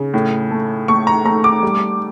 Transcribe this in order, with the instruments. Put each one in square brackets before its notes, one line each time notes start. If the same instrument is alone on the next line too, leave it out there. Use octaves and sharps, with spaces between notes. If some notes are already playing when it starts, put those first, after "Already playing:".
Already playing: [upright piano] C#3
A2
A3
A3 C#6
A#5
A3 A#5
D6
G3